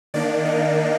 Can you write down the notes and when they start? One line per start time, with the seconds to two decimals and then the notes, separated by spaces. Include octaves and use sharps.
0.14 D#3 A#3 D4 D5
0.45 D#4